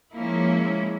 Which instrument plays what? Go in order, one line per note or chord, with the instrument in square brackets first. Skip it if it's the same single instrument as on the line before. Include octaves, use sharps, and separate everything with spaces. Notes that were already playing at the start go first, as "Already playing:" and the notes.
[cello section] F3 A#3 C#4 E4 [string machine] G#3